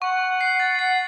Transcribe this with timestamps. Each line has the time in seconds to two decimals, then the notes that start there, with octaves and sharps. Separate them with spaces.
0.01 F#5 C#6
0.41 C7
0.60 A6
0.79 F#5 C7